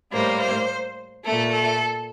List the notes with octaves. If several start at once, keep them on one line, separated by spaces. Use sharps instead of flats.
A2 G3 A#3 C5
C5
A#2 A3 A4
A4